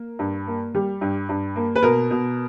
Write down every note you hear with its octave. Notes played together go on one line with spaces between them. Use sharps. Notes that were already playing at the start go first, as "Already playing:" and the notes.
Already playing: A#3
G2
A#3
G3
G2
G2
A#3
B4
B2 A#4
B2